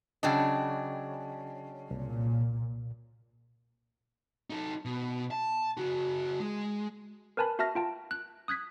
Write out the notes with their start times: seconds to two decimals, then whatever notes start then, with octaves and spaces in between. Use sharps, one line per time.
0.23 C#3 F#3 D4 D#5 G5 A5
1.91 C2 A#2
4.50 D#4 A4
4.85 B2
5.31 A5
5.77 C#3 F#4
6.40 G#3
7.37 A#4 B4 G#5 A5 B5
7.59 F#4 E5 A5 F6 A#6
7.75 F4 G5 A5
8.11 F#6
8.48 D#6 F#6 G#6 B6